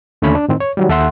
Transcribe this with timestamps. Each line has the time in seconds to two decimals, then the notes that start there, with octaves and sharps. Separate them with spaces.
0.22 D#2 D3 A3 C#4 C#5 B5
0.35 D4
0.48 A2 D#3 C4
0.61 C#5
0.77 D#3 F#3 G3
0.89 D#2 A4 E5 F#5 C6